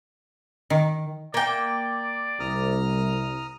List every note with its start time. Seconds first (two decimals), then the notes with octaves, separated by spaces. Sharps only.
0.70 D#3
1.34 A#3 D5 G5
2.40 C2 A#5 D#6 F6